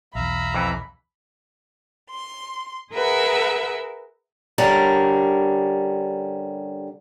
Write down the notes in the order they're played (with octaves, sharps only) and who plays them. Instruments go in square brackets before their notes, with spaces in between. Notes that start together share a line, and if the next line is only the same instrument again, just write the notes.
[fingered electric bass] B1 E2 [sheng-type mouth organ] E5 F5 A#5 [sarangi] B5
[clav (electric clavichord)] F2 E3
[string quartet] C6
G#4 A#4 B4 E5 F#5
[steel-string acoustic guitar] D3 G3 C#4 A#4